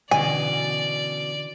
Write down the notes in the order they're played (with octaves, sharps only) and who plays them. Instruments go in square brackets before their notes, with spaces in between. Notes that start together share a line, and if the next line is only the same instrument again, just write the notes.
[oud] B2 [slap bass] D3 E3 C#4 [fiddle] D5 [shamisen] G#5